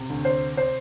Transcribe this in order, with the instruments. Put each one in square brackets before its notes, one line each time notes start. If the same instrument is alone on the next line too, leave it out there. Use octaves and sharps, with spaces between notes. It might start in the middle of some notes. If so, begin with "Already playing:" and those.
Already playing: [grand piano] C3
D2
C5
C5